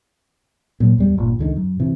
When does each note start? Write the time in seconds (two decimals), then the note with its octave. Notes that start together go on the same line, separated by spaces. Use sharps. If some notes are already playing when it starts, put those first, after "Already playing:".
0.80 A#2 F#3
0.98 E2 G3
1.18 G1 A#2
1.39 C#2 D3 D#3
1.56 F#2
1.80 C3 E3